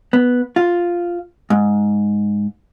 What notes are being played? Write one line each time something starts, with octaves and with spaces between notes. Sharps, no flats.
B3
F4
G#2